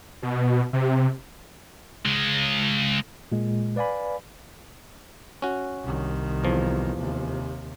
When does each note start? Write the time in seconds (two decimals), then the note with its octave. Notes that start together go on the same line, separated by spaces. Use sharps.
0.23 B2
0.73 C3
2.06 C#3 G#3
3.32 A#2 G#3
3.76 B4 D5 F5 G#5 B5
5.42 C#4 F#4
5.84 C2 D#3
6.44 E2 F3
6.98 D#2 C3